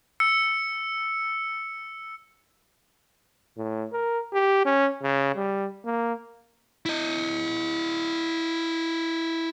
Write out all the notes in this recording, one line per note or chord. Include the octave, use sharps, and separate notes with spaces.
E6 C#7
A2
A#4
G4
C#4
C#3
G3
A#3
E4 D#5